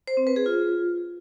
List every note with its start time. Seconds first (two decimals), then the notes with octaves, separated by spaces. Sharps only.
0.08 C5
0.17 C4
0.27 B4
0.36 G#4
0.46 F4